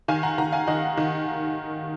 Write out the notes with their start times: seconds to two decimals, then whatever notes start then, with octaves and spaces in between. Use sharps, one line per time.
0.08 D#3 F5 G#5
0.23 F#5 A#5
0.38 D#3 F#5 A#5
0.52 F5 G#5
0.67 D#3 D#5 F#5
0.97 D#3